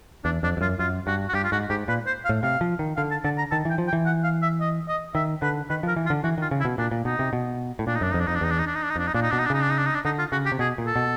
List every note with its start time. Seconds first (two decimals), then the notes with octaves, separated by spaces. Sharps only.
0.24 E2 D4
0.43 F2 D4
0.57 F2
0.61 F#2 F4
0.79 F#2 F4
1.07 G2 F#4
1.29 F#4
1.34 G2 G4
1.44 F4
1.52 G#2 F#4
1.70 G#2 G4
1.88 A#2 B4
2.07 C5
2.25 F5
2.29 A2
2.43 C3 F5
2.61 F3
2.79 D#3
2.97 D3 F5
3.11 A5
3.24 D3 A5
3.38 A#5
3.51 D#3 A5
3.65 E3
3.70 G5
3.78 F3
3.88 G5
3.93 E3
4.06 F#5
4.24 F5
4.42 E5
4.61 D#5
4.88 D#5
5.15 D#3 E5
5.42 D3 B4
5.70 D#3 B4
5.83 F3 A#4
5.96 E3
6.06 F4
6.10 D3
6.24 E3 F#4
6.38 D#3 F4
6.51 C#3
6.60 E4
6.65 B2
6.78 A#2 D4
6.91 A#2
7.05 B2 D#4
7.19 C3
7.33 B2
7.79 A2
7.87 A#2 D4
7.95 D#4
8.01 F#2 D4
8.12 F2 D#4
8.19 D4
8.27 F2 D#4
8.35 D4
8.41 E2 D#4
8.51 D4
8.59 D#4
8.67 D4
8.75 D#4
8.83 D4
8.90 D#4
8.96 F2 D4
9.07 D#4
9.14 A#2 D4
9.22 D#4
9.31 B2 D4
9.38 D#4
9.46 D4
9.50 C#3 D#4
9.62 D4
9.70 D#4
9.78 D4
9.85 D#4
9.95 D4
10.05 D3 D#4
10.19 F4
10.32 C#3 F#4
10.46 G4
10.52 C3
10.59 B2 G#4
10.78 A#2
10.87 A4
10.96 B2